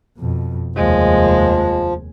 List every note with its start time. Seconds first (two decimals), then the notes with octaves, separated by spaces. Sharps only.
0.18 F2 B2
0.76 F1 D#2 F3 G#3